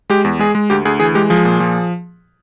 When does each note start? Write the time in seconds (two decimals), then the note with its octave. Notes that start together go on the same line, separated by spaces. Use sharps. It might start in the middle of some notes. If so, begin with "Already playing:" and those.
0.10 G#3 G4
0.25 E2
0.39 G#3 G#4
0.55 G#3
0.70 D2 G4
0.85 D2 G#4
1.00 E3 G#4
1.15 G#3 G4
1.30 F3 G#4
1.45 A#2
1.60 F3